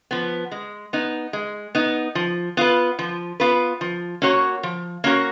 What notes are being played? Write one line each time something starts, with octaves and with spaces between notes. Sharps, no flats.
F3 B3
G#3
B3 D#4
G#3
B3 D#4
F3
B3 F4 B4
F3
B3 F4 B4
F3
A#3 C#4 F#4 C#5
F3
A#3 C#4 F#4 C#5